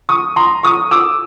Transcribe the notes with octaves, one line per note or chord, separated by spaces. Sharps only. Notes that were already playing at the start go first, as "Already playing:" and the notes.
C#6 D#6
A#5 C6
C#6 D#6
D6 E6